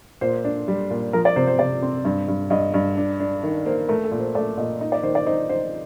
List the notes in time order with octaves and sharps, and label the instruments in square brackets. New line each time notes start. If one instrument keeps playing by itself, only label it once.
[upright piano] A#2 [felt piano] C5
[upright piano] D4
G3
A#2
[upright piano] F3 [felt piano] A#4
[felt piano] D5
[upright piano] C3 [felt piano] C5
[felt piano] C5
[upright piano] C3 [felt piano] D5
[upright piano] C4
G2
G2
[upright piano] G2 [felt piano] D#5
[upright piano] G2
D4
D4
D#3
[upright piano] A#3 [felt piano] C5
[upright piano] A3 [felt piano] A#4
[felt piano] A4
[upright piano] A#2
[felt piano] C5
[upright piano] A3 [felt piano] D5
[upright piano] A#2 [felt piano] D#5
[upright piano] D#4
[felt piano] D5
[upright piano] D#3 [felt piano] C5
[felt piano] D5
[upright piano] D#4 [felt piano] C5
[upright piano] D#4 [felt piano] C5